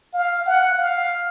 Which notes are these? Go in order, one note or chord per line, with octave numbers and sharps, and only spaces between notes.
F5
F#5
F5